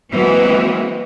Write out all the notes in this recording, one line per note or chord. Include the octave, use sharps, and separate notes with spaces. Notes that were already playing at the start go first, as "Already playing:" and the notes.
E3 F#3 G#3 A#3 C4 F#4